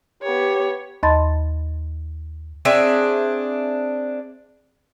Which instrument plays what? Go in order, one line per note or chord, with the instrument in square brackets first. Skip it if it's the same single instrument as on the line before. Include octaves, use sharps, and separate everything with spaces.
[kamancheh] B3 C#5 [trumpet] G4
[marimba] D#2 D#5 A5 B5 C6 A6
[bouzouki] C4 D4 G#4 E5